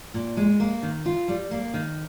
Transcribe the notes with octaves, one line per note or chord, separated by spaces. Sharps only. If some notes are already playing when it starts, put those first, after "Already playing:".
A#2
G#3
A#3
D#3
F4
G3
A#3
D#3